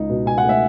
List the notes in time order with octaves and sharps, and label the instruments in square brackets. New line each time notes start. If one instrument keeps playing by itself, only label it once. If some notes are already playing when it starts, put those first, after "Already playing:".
Already playing: [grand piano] C#2 D#4
B2
B2 G#5
F#5
A3
E5